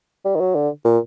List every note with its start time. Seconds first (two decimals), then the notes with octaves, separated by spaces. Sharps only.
0.25 G3
0.36 D#3
0.40 F#3
0.55 D3
0.85 A#2